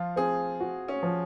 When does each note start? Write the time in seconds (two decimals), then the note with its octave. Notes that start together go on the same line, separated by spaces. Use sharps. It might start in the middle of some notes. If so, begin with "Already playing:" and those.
Already playing: F3 F4
0.16 C4 G#4
0.60 F#4
0.88 C#4
1.03 F3